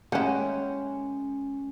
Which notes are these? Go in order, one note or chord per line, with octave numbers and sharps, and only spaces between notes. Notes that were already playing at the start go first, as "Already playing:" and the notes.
G#3 A#3 C#4 E4 F#5 G5